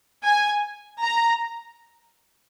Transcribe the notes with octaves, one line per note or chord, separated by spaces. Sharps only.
G#5
A#5